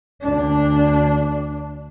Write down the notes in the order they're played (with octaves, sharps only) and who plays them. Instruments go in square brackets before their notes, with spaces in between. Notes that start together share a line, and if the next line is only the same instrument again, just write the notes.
[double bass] D2 D4